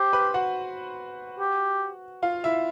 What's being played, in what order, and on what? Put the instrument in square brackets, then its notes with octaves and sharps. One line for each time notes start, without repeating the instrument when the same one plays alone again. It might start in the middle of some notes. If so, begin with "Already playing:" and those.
Already playing: [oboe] G4 [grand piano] C5 C6
[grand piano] B4 B5
F#4 F#5
[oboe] G4
[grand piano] F4 F5
E4 E5